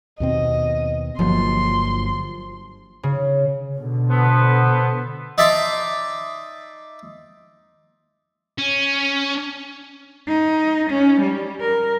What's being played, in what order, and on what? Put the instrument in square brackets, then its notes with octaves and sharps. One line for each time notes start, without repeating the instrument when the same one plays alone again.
[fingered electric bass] D#2 B2 C4 [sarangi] D#5
[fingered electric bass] G1 F#3 A#3 [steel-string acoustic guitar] F3 [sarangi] C6
[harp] C#3
[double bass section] B2 D3
[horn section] B3 A4 C5
[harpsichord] D#4 D5 E5 A5 C6
[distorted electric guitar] C#4
[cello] D#4
C#4
G3
A#4